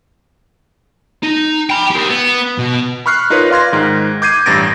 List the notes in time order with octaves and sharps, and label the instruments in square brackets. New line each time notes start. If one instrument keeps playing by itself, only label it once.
[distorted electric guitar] D#4
G5 B5
G4 A#4
B3
B2
[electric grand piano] B5 C#6 F6 F#6 C7
D#4 F4 A#4 B4 C#5
D5 F5 C6 G#6 A#6
G#2 D#3
D6 G6 G#6 C7 D#7
A1 G2 A6 A#6 D7